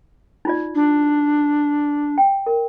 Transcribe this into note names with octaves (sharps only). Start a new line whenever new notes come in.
D#4 F4 D5
D4
G5
A#4